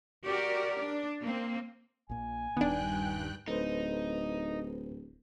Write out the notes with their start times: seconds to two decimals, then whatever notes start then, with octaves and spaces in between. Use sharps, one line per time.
0.25 F#4 G4 A#4 D5
0.75 D4 D5
1.22 A#3 C4
2.09 A#1 A#2 G#5
2.57 D#1 G2 D#3 B3 D4 G5 F#6
3.48 D1 D#4 A4 B4 C5